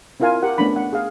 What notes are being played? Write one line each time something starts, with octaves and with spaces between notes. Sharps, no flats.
C4 E4 F4 A#4 F5 G#5
G4 A#4 F#5
A3 B3 C#4 D4 B5
F#5
G#4 F5